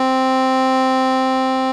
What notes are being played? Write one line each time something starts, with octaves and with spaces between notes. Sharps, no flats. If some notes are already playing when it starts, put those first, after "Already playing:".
Already playing: C4